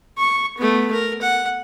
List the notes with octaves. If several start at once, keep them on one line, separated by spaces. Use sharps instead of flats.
C#6
A3 B3
A#4
F#5